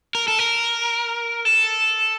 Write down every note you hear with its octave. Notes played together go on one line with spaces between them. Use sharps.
A#4
A4
A#4
A4